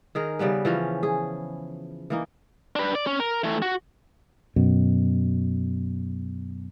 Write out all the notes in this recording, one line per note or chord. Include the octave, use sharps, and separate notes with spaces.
D#3 G#4 A#4
C#3 G3 B3 B4
E3 F3 C#4
G#4
E3 A#3 D#4
D4 B4
D5
C#4
A#4
E3 A3
F#4
F#2 B2